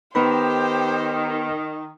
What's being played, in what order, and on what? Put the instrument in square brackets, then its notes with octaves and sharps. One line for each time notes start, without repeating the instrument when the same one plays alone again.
[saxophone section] D#3 [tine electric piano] B3 B4 B5 [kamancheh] G4 C5